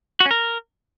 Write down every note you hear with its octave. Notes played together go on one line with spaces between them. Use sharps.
F#4
C#4
A#4